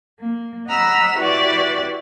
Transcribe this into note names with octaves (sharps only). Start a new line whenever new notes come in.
A#3
D#5 F#5 A#5 B5 E6 F6
E4 F#4 G4 B4 D5